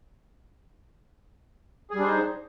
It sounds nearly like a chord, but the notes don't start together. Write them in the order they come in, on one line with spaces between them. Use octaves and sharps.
G#4 G3 D4 C5 D#4